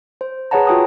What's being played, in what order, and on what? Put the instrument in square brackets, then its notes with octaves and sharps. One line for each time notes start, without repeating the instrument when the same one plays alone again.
[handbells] C5
G#4 B4 C#5 F#5 A5 A#5
F4 F#4 G5 A5 D#6